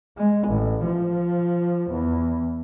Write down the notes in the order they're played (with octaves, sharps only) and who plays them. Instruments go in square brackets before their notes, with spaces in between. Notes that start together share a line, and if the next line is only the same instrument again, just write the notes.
[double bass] G#3
A1
F3
E2